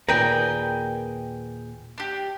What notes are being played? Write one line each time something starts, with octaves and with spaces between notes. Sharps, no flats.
D#2 A#2 G#4 A#4 B4 D5 G5
D4 G4